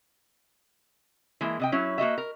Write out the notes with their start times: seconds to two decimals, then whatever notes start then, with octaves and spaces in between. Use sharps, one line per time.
1.41 E3 G#3 A#3 E4
1.60 C3 D#5 G5
1.72 F#3 C#4 E4
1.98 A#3 F#4 D#5 E5
2.18 A#4